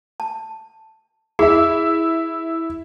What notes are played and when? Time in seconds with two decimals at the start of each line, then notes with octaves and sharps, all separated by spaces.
0.20 A5
1.39 E4 G#4 E5